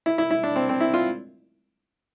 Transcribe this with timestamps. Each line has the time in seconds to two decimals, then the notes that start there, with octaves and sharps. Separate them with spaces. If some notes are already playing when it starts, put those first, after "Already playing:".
0.06 E4
0.18 E4
0.31 E4
0.43 D4
0.56 C4
0.69 C4
0.81 E4
0.94 F4